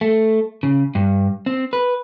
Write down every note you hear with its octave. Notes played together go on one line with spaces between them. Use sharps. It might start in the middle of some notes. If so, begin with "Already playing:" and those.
A3
C#3
G2
C4
B4